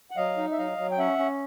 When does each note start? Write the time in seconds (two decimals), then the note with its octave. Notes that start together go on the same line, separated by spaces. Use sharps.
0.11 F#5
0.17 F#3 D#5 F5
0.37 D#4
0.52 E5
0.58 F#3 D#5 F5
0.78 F#3
0.91 G5
0.98 C#4 E5 F#5
1.18 C#4